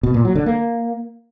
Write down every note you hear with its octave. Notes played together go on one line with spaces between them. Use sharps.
B2
A#2
F#3
D3
A#3